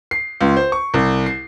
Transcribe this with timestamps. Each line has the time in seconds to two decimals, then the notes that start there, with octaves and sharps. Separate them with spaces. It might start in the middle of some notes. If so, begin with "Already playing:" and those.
0.11 C7
0.41 C#2
0.57 C5
0.72 C#6
0.94 C2
1.26 C7